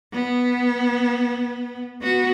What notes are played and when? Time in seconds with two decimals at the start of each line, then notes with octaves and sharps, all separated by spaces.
0.13 B3
2.02 B3 F#4